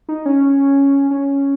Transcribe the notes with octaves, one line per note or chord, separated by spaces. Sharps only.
D#4
C#4
C#4